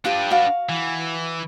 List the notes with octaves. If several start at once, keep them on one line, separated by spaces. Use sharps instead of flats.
D4 F4 G4 B4 G5
F#4 F5
E3